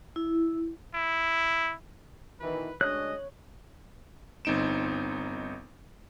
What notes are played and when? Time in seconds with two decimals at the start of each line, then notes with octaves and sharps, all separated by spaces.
0.16 E4
0.94 E4
2.40 B2 D#3 E3 B4
2.81 D2 G#3 D4 C#5 D#5 F#6
4.45 G1 C4 D#4 D7 E7